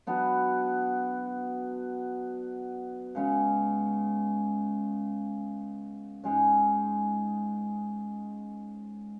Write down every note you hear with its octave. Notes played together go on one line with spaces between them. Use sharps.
F#3 B3 D4 F#4
C#3 G#3 C#4
G#2 G#3 C#4